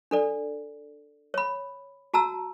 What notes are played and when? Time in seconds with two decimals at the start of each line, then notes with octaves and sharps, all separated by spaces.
0.11 D4 A4 D5
1.34 C#5 B5
2.14 F#4 A5 A#5 E6